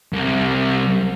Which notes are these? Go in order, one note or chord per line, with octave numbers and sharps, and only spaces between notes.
C2